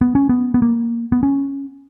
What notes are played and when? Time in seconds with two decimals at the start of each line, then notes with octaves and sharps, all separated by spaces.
0.01 B3
0.15 C#4
0.29 B3
0.54 B3
0.62 A#3
1.12 B3
1.23 C#4